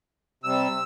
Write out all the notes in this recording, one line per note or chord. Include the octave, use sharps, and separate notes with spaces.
C3 G3 E6